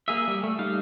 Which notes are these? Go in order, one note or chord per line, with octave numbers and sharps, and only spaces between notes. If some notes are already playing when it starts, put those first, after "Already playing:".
A#3 G#4 E5
G3
A3
G3 D#4 F5